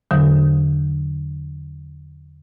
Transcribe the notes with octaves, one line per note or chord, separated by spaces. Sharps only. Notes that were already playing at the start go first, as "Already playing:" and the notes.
E2 D3 F#3